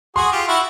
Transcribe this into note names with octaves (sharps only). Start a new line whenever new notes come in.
F#4 G#4 C6
F4 G4
E4 F#4